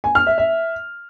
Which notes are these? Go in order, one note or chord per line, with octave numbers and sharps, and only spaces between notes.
G#5
F6
E5
E5